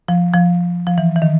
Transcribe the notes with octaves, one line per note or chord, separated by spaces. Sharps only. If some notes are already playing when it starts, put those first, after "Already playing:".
F3
F3
F3
E3
E3
D#3